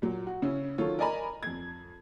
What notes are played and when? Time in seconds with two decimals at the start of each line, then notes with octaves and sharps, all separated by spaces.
0.02 A#2 F#3
0.27 F#4
0.42 C#3 C#4 E4
0.78 D#3 F#3 F4 A4 C#5
0.99 A#4 D5 D#5 G#5 A#5 B5
1.43 F2 G#6